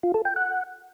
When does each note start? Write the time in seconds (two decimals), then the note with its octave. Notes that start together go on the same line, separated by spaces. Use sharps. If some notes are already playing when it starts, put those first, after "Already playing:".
0.03 F4
0.14 A4
0.25 G5
0.36 F#5